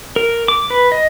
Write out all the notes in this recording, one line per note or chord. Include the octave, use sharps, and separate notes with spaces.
A#4
D6
B4
D#5